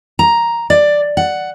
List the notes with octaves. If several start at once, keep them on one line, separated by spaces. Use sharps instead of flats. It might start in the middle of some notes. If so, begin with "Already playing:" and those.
A#5
D5
F#5